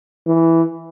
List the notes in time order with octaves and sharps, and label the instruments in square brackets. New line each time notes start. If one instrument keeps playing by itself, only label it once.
[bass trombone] E3